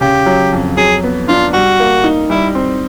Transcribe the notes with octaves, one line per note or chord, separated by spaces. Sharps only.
C#3 G4
F#3
F2
F#3 G#4
B3
D4 F4
G3 F#4
A#3
D#4
G3 E4
C4